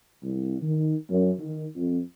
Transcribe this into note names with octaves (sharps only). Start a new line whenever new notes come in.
C2
D#3
F#2
D#3
F2